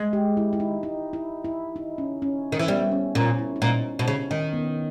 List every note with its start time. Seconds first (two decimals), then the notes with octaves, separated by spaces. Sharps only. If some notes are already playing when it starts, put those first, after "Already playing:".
Already playing: G#3
0.13 G4
0.37 E4
0.53 E4
0.60 D#4
0.83 D#4
1.13 E4
1.45 E4
1.76 D#4
1.98 C#4
2.22 C#4
2.52 D#3
2.59 E3
2.68 G3 B3
2.92 C#4
3.15 A#2 C#4
3.39 E4
3.56 D#4
3.61 A#2 C#4
3.99 B2
4.08 C#3 C#4
4.31 D#3
4.53 B3